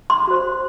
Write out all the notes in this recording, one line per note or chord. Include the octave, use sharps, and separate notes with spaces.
C6
F#4 C5